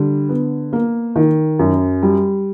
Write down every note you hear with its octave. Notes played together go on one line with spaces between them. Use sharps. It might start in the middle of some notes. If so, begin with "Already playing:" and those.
Already playing: D3 G3
B3
A#3
D#3
F#2
G3